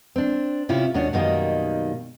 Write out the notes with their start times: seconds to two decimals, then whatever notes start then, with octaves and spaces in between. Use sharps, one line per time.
0.16 C4 D4
0.69 C3 C#4 E4 F4
0.94 D#2 B2 C#4 D4 C#5
1.13 F#2 B2 D#3 G3 A#3 D#4